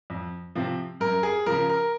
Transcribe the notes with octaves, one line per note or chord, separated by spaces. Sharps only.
F2
C3 F3 C4
F#2 A#4
G#4
C#3 F3 A#4
A#4